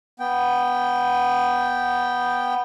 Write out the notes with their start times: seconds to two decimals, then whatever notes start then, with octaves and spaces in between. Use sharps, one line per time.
0.20 B3 G5